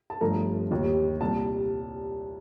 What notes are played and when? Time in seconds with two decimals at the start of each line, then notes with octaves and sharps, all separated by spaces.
0.10 A5
0.21 G1 G2 F3 A3 A#5
0.71 D#2 D#3 G3
1.21 C2 A#2 G3 A5